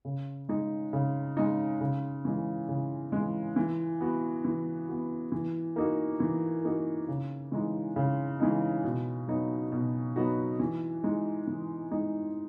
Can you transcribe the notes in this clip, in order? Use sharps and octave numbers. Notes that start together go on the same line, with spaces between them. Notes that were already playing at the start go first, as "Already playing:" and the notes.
C#3
G#3 D#4
C#3
G#3 D#4
C#3
E3 G#3
C#3
E3 G#3
E3
B3 F#4
E3
B3 F#4
E3
A#3 D#4 F#4
E3
A#3 D#4 F#4
C#3
E3 G#3 D#4
C#3
E3 G#3 D#4
B2
F#3 B3 D#4 F#4
B2
F#3 B3 D#4 F#4
E3
G#3 D#4
E3
G#3 D#4